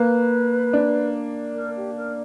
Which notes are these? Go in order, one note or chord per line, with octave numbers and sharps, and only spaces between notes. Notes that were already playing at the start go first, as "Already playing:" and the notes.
Already playing: A#3 B4
D4
A#4
G4
A#4